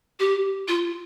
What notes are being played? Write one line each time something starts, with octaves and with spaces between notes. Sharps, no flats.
G4
F4